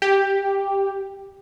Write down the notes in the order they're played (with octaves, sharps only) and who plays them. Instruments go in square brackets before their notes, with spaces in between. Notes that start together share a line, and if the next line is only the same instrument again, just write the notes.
[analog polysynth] G4